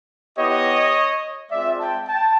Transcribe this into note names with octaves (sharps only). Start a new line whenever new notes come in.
B3 E4 G4 C#5 D#5
G#3 C4 F4 D5 E5
G5 A5
G5 A5